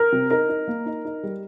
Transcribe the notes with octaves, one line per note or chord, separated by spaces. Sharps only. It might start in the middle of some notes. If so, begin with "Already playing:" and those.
Already playing: A#4
C3
D#4 A#4
D#4
A#3
D#4
D#4
G3